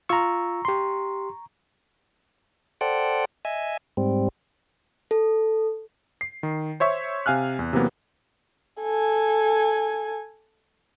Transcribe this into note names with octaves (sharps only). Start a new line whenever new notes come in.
F4 A#5 C#6 E6
G4 C6
A4 C5 D5 F#5 G5
D#5 E5 G#5
G#2 G3 C4
A4
C7
D#3
C5 C#5 E5 C#6
C3 F5 G#5 F6 F#6
E2
C3 E3 F#3 A#3 B3
A4 G#5